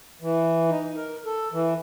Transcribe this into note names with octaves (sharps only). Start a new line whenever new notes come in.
E3
D#4
A#4
A4
E3